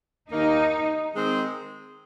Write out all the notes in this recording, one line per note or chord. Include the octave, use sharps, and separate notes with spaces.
D#2 D#3 A#3 D#4
D#3 G#3 C4 G#4 C5